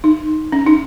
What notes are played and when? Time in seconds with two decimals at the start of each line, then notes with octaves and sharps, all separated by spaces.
0.04 D#4
0.52 C#4
0.67 D#4